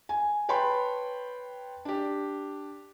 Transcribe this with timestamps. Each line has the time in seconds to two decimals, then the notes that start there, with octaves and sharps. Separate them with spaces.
0.09 G#5
0.49 B4 C#5 G5 A5 B5 C6
1.85 D4 G4